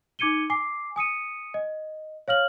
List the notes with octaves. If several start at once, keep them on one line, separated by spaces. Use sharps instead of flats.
D#4 D6 G#6 C#7 D#7 G7
G#5 D6 C7
G#5 D#6 C#7 D#7
D#5
C#5 F5 F6 F#7